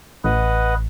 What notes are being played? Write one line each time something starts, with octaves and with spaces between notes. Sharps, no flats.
A1 B4 D#5 F#5